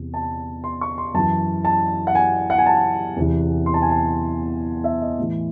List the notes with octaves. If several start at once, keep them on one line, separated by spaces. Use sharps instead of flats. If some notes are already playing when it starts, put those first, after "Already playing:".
Already playing: E2 C3
A5
C6
C#6
C6
F#2 E3 A5
A5
F#5
G#5
F#5
G#5
A5
E2 C3 E3
C6
A5
G#5
A5
E5
D#5
A2 E3